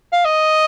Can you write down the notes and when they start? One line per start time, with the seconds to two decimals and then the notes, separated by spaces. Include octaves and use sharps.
0.13 F5
0.25 D#5